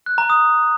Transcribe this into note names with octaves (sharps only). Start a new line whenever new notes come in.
F#6
A#5
D#6